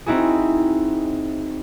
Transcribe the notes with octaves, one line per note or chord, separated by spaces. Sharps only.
C4 D#4 E4 F#4 G#4